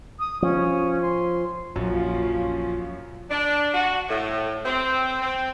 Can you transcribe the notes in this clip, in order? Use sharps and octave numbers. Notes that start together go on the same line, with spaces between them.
D#6
F3 C#4
C6
A#1 F#2 F3 C#4 F4
D4
F#4
A2
C4
C4